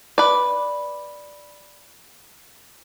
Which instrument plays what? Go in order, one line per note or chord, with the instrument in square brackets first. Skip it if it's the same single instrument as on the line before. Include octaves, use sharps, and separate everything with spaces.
[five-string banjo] B4 D5